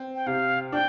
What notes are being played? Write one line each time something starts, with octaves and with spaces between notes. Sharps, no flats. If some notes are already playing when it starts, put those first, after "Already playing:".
Already playing: C4
G5
C3 F5
D4 G5